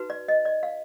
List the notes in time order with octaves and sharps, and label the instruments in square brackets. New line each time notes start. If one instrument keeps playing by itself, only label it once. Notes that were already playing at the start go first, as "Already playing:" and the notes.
Already playing: [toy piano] D#4 F#4 B4
D5
D#5
D5
F5